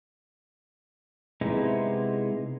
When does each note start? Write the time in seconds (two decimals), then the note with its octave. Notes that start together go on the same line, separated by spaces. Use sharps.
1.41 C3 G#3 B3 D#4 E4